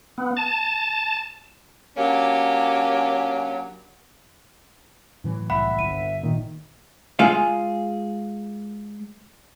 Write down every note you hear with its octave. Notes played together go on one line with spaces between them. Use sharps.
B3
A5
F#3 A#3 C#4 D4 G4
A2 E3 F#3
C2 E5 F#5 B5
G1 D#7
A#2 D#3
G#3 F4 G#4 F5